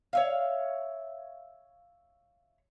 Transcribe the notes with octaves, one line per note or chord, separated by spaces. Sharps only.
C#5 E5 F5